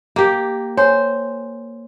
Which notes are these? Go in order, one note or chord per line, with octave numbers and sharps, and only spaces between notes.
A#3 G4
C5 C#5 G#5